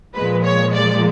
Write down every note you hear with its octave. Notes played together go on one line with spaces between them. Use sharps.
A#2 F3 G#3 B4
C#5
D5